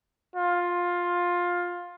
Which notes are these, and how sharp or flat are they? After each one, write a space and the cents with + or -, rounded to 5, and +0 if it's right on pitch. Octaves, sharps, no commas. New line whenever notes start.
F4 +15